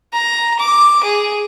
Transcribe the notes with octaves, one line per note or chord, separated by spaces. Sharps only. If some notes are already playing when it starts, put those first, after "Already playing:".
A#5
D6
G#4